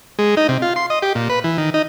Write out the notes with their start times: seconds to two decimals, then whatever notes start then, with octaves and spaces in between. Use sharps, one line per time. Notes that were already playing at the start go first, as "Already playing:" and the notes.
0.19 G#3
0.37 D#4
0.49 C3
0.62 F4
0.76 C6
0.90 D#5
1.02 G4
1.15 A#2
1.30 B4
1.44 E3
1.58 D#3
1.74 D#4